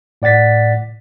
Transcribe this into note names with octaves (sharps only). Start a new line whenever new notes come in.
A2 D5 F#5 A6 B6